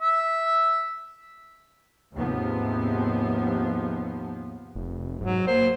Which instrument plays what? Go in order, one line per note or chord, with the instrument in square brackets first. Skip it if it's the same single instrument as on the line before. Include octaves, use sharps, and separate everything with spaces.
[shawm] E5
[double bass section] D#2 G#2 C3 F3 B3
[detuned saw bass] F1
[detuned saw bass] G#2 [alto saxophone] F#3
[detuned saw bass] A#3 [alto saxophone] C5